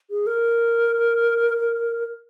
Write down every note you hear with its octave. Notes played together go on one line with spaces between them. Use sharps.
G#4
A#4